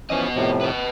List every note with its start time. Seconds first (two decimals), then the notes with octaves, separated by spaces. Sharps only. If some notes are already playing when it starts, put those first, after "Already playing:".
0.10 E3 F3 B3 C#4 D#5
0.35 A2 C3 F3
0.61 B4 D#5